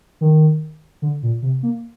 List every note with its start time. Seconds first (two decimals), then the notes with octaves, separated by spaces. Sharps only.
0.21 D#3
1.02 D3
1.23 A#2
1.42 C3
1.63 A#3